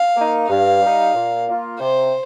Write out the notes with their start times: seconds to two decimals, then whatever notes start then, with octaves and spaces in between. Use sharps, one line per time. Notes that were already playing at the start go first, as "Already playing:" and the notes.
Already playing: F5
0.16 A#3 D#4
0.49 G2 F5
0.81 G3 D#4
1.14 A#2
1.48 A#3 F4
1.79 C3 C5